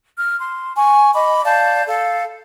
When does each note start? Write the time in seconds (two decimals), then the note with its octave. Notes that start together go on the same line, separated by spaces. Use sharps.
0.16 F6
0.39 C6
0.75 G#5 C#6
1.13 D#5 B5 D6
1.45 D5 F5 A5 G6
1.87 A4 F5